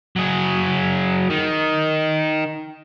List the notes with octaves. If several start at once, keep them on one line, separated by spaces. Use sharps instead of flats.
F#3 G#4
D#3